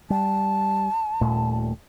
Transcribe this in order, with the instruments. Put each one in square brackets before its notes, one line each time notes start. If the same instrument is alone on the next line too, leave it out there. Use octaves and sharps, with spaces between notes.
[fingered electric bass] G3 [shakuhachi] A5
[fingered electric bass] D#1 A#2 A3